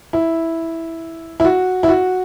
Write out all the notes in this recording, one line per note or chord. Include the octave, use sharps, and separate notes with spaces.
E4
E4
F#4
E4
F#4